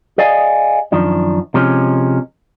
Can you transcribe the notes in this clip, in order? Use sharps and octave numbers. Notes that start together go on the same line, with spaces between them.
G#4 D5 D#5 F5 G#5
F#2 D#3 F3 D4
C3 F3 G#3 C#4